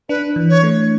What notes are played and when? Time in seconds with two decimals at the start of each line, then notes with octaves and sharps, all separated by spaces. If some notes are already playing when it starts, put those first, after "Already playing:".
0.09 D4 B4
0.36 E3
0.50 C#5
0.63 A3